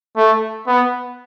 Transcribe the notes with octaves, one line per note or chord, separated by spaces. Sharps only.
A3
B3